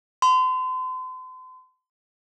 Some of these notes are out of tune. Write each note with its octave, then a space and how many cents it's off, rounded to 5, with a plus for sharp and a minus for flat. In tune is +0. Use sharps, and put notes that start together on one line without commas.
C6 -40